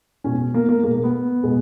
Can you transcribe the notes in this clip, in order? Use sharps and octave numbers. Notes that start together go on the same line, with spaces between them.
B2 G#3 C#4
A#3
A#3
B2 G#3 A#3
A#3
B3
B2 G#3